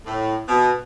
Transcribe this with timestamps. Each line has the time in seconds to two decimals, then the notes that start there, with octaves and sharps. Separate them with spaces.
0.05 A2
0.47 B2